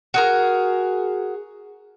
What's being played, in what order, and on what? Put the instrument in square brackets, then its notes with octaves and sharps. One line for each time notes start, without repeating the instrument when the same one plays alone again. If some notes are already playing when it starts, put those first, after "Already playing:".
[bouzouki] F#4 G#4 A#4